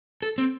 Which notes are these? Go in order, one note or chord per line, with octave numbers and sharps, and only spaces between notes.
A4
C4